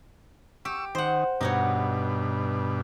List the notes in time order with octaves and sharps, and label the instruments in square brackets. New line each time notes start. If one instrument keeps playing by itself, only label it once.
[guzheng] G4 [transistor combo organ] C#6 E6
[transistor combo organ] D#3 [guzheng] C5 F#5
[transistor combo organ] G2 B2 D4 [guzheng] D#4 F#4 C#5